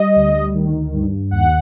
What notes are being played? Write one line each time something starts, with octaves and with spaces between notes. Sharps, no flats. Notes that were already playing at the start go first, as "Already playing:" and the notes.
Already playing: G3 D#5
D2
D#3
G2
D#2 F#5